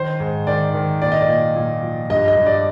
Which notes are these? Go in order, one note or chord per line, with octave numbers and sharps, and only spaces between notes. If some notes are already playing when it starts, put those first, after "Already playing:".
Already playing: D#3 C5
G#2
D#3 D5
D#3
A#2 D5
D#5
D5
A#2
A#2
F3
G2 D#5
D#5
G2
D5